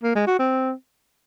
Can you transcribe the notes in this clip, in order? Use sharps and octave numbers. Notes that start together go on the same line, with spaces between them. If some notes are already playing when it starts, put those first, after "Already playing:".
A#3
G#3
F#4
C4